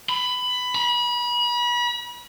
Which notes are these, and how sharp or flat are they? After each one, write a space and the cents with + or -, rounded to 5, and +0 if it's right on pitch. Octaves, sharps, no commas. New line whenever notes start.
B5 +15
B5 -35